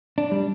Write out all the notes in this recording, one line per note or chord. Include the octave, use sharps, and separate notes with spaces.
D4
G3